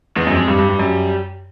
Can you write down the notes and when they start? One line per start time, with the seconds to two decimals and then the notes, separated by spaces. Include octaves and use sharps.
0.16 E2 G#3
0.27 F#2
0.32 F2 G#3
0.47 G2 G3
0.59 G2
0.69 G2
0.79 F#2